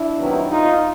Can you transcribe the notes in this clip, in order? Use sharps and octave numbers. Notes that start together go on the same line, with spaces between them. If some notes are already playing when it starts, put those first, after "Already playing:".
Already playing: D4 E4
C3 D#3 F#3 B3
D#4 F4